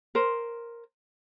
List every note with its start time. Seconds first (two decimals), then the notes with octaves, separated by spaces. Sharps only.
0.15 A#4 C5